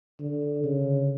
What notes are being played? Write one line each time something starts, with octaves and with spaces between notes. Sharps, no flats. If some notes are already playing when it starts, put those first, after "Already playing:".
D3
C#3